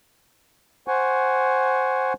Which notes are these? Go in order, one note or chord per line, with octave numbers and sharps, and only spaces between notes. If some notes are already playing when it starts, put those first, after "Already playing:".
C5 F#5 G#5 C#6